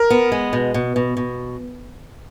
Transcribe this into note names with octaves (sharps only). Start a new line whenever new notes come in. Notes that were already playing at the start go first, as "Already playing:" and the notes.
Already playing: A#4
B3
G#3
B2
B2
B2
B2